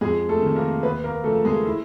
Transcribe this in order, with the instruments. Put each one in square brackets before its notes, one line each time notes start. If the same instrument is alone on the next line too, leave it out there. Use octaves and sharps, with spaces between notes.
[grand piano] F2 G#3 G#4
A3 A4
C3 D#3
A#3 A#4
D#2 B3 B4
A#3 A#4
C#3 F3 A3 A4
G#3 G#4
E4